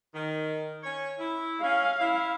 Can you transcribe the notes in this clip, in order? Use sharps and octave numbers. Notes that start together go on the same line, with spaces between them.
D#3
C#4 C#5
E4
C#4 F5
E4